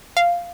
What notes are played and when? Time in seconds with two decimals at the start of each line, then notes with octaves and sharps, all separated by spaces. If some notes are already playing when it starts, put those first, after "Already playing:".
0.17 F5